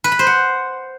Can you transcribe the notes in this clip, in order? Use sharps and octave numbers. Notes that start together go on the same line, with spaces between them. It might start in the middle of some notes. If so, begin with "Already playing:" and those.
B4
B5
C5
F#5